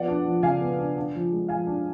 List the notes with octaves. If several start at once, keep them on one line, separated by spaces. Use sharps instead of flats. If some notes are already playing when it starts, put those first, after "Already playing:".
Already playing: F3 B3 D5 F#5
D4
F3
C#3 F5 G#5
B3
D4
D4
F3
G#3
F3 F5 G#5
D4